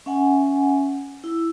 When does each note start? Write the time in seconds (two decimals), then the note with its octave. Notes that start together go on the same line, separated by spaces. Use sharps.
0.06 C#4 E5 F#5 G#5
1.24 E4 E6